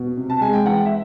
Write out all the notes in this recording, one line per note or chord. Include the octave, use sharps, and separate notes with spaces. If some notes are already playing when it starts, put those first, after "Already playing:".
Already playing: B2
C3
A5
G#3 G#5
G5
E3 F#5
E5